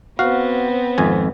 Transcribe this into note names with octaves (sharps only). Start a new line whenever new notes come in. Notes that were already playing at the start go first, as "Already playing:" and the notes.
B3 C4 F#4 F5
G#1 F2 G#5